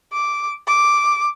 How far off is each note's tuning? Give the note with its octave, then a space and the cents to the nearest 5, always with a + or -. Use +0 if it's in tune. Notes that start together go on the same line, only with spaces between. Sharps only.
D6 -5
D6 +0